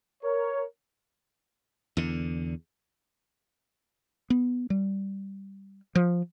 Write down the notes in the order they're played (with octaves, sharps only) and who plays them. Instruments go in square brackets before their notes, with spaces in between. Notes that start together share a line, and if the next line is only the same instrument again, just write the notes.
[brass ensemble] A#4 C#5
[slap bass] E2 D3
[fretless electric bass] B3
G3
F3